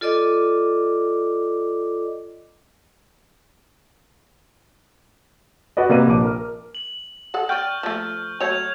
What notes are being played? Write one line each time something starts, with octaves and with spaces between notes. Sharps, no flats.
F4 A4 D5 D#5 D6
F#4 B4 D5 D#5
C3 A#3 B4 D#7
A#1 D6
A#4 F6
F#7
G#4 A4 F#5
D5 G5 C#6 F6 G6
F3 A3
F#3 A3 C#5 G6 G#6 F7